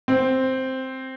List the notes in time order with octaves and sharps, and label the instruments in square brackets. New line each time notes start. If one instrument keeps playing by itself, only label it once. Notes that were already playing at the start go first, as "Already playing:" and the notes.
[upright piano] C4